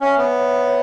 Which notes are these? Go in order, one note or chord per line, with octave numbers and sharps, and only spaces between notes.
C#4 C#5 E5 G#5
B3
C#5 E5 G#5
C#5 E5 G#5